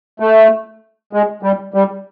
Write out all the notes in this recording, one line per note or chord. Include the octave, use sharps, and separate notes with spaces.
A3
G#3
G3
G3